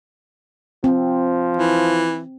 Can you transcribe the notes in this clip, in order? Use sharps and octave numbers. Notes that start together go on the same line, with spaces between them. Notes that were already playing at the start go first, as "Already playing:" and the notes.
F3 C4
E3